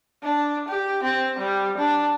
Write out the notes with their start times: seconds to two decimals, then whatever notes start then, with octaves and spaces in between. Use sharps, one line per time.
0.23 D4
0.69 G4
1.03 C4
1.39 G3
1.78 D4